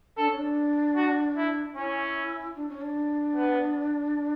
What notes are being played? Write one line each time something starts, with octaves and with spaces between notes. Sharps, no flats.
D4 A4
C#4
D4
F#4
E4
C#4 E4
D4
C#4
D4
B3